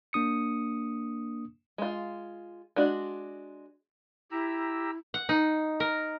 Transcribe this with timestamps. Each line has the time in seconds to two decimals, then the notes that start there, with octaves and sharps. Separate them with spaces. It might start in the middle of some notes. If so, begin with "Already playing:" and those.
0.13 A#3 D4 D#6 C#7
1.78 G#3 F4
2.76 G#3 D4 F#4
4.31 E4 G4 A#5 E6
5.14 F#5
5.29 D#4
5.80 A#4